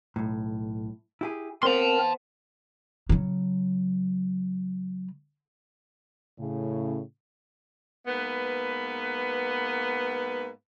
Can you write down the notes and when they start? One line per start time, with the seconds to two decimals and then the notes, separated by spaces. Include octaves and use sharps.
0.16 B1 A2
1.21 E4 G4 G#4
1.63 B3 C4 A#4 C5 A5 C6
3.09 C#3 F#3
6.39 A2 C#3
8.07 G#2 A#3 B3 B4